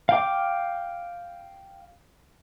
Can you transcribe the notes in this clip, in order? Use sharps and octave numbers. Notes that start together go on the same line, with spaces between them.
F5 G5 D6